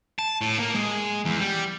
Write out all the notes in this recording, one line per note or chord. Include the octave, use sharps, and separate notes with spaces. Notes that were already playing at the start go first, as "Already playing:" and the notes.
A5
A2
A#3
G#3
E2
G3